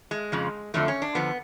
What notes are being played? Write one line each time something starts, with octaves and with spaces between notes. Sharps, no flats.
G#3
F2 C#3 F3
F2 D3 F3 A3
C#4
D4
F2 D3 F3 B3